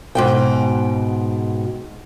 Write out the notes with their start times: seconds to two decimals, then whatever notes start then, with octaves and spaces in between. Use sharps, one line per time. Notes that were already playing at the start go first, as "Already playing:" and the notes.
0.15 G#2 B2 G5